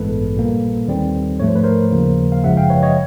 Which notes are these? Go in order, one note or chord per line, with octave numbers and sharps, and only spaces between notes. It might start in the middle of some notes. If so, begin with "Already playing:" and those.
Already playing: A1 G2 E3 G#3 B3 A4 B4
A#1 A#2 G3 A#3
D#2 D#3 G3 C4
G#2 F3 A3 C#5
C5
B4
A#4 C5
D#2 C#3 F3 A#3
F5
G1 F#2 C#3 F3 G#3 E5 F#5
F5 G5
B4 C#5
C#5 D#5